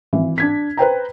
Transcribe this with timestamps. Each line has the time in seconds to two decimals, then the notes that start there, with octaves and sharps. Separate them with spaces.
0.13 G#1 E3
0.38 D4 G#6 B6
0.77 B4 C5 G5 A#5